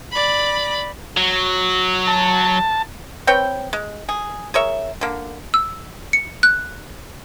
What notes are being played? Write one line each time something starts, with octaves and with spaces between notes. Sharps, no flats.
D5 B5
F#3
A5
C4 B4 C#5 G5
G#3
G#4
G#4 A#4 C#5 E5
D3 A#3
E6
C#7
F#6